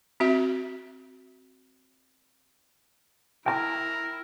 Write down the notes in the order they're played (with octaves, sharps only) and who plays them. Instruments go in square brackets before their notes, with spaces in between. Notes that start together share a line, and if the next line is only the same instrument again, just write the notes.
[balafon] C4 F#4 E5
[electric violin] E4 [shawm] A#4 [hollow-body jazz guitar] G5 A5 A#5